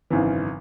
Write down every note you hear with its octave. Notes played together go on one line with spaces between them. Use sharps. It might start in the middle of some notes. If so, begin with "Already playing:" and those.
G#1 F#2 C#3 E3